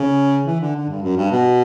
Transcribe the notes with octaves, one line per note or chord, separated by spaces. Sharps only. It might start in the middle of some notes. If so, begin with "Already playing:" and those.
Already playing: C#3
E3
D3
D3
G2
F#2
G2
B2